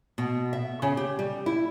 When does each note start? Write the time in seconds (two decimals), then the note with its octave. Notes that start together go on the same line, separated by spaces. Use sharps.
0.18 B2
0.53 E5
0.82 C#3
0.97 G4
1.19 G3
1.46 E4